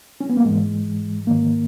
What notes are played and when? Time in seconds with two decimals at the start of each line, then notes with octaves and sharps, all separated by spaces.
0.21 C#4
0.29 B3
0.37 A#3
0.45 G#2 E3 G#3
1.27 G#2 D#3 A#3